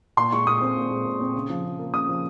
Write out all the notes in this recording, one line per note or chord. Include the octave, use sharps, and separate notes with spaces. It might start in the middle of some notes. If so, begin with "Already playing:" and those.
A#2 C6
G#3 C#6
A#2 D#6
C4
A#2
G#3
A#2
C4
C#3
F3
C#3
A#3
C#3 D#6
F3